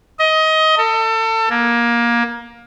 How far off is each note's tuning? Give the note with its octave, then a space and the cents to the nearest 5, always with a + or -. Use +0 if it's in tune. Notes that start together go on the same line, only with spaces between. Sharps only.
D#5 +20
A4 +30
A#3 +20